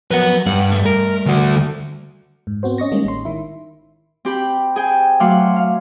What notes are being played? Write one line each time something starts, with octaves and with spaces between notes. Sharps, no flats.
F3 F#3 A#4 B4 F#5
G2 F#5
G3 A3
A#4
D2 F#4
G#2
B3 C4 F#4 C5
C#4 D#5 C#6 A#6
D#3 G3 G#3 A#3 C#4
A1 C6
D#3 E4
C4 G4 B5
G#4 G5
F#3 A3 F5 F#5 C6 D6
F5